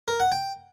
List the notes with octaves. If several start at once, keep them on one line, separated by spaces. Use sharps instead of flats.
A#4
F#5
G5